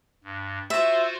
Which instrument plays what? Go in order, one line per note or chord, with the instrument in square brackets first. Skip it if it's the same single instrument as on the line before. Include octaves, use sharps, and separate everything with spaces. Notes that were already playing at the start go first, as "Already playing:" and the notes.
[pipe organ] G2
[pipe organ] F4 F#4 C5 [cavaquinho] E5